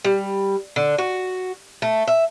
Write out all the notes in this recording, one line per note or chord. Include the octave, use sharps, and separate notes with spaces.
G3
D3
F#4
A3
E5